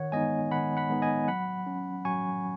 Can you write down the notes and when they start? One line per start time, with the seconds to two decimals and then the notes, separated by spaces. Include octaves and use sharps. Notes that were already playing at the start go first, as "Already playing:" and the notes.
Already playing: D#3 C#5 F#5
0.12 G#3 B3 D#4 D#5 G#5
0.51 D#3 F#5 B5
0.77 F#5 B5
0.90 G#3 B3 D#4
1.02 D#5 G#5
1.28 F#3 F#5 B5
1.67 C#4
2.05 F#3 G#5 C#6